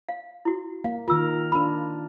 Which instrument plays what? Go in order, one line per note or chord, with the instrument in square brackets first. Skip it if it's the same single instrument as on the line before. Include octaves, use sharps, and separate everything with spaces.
[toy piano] F5
E4 F#4
[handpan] A#3 [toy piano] F5
[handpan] D#3 A#4 [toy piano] F4 E6
[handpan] D4 F4 [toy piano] A#4 B5